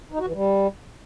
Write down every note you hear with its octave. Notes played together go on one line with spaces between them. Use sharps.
D#4
F#4
E3
G3